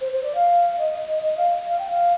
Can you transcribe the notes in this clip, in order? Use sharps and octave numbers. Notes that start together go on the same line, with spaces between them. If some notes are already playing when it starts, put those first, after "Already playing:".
C5
C5
D5
F5
D#5
D#5
D#5
F5
F5
G5
F5